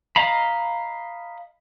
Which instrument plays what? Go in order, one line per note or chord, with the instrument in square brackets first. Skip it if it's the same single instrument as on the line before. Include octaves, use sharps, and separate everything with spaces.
[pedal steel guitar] D#5 F5 A#5 B5